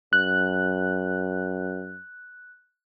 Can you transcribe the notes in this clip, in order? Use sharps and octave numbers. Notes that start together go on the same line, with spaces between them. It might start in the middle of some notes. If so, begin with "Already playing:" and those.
F#2 F#6